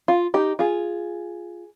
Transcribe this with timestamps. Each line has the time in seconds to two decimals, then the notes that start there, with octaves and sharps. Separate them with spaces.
0.08 F4
0.34 D#4 G4
0.59 F4 G#4